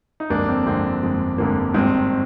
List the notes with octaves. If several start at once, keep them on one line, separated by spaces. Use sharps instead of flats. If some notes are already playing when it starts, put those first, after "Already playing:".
D#4
G1 F2 D3 G#3 A#3 D4
C4
G1 F2 D3 G#3 C4
G1 F2 D3 G#3
G1 F2 D3 G#3 A#3
G#1 G2 D#3 G#3 C4